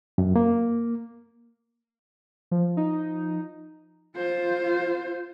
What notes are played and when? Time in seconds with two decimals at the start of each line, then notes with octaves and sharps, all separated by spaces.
0.18 F#2
0.36 A#3
2.51 F3
2.77 D#4
4.16 F4 C5